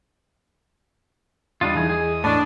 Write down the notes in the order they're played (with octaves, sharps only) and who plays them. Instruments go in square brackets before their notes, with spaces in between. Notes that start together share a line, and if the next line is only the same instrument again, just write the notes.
[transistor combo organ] E2 D#5 D#6 [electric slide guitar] G3 D4 F4
[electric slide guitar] E3 D#4 G#4
G#4
[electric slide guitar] A2 [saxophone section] D4